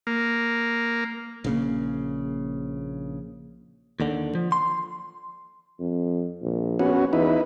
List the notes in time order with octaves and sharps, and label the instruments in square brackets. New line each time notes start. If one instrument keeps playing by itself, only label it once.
[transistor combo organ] A#3
[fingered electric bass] A#1 C#3 A#3
[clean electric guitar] D#2 D3
F3
C6
[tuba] F2
A#1
[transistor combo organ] B3 C#4 F#4
[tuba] E2 [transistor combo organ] D#4 E4 B4